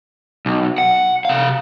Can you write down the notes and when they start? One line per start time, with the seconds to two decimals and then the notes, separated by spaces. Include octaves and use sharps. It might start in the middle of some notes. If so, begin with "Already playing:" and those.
0.46 B1
0.78 F#5
1.25 C3 F5